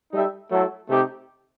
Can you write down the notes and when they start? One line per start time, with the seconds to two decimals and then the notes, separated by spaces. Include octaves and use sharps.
0.13 G3 D#4 A4 E5 G5
0.51 F#3 A3 E4 A4
0.89 C3 A3 D#4 G4